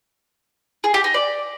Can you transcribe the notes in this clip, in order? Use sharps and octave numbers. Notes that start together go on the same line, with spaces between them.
G#4
G4
D#4
D5